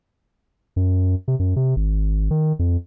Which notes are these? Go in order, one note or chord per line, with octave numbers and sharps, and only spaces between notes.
F#2
C3
F#2
C3
G#1
D#3
F2